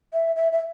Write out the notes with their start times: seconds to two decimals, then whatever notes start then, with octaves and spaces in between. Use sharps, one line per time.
0.13 E5
0.36 E5
0.52 E5